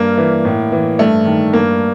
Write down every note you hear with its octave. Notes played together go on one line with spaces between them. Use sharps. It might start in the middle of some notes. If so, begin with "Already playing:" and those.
Already playing: G2 A#3
E3
A2
E3
G2 A3
D#3
G2 A#3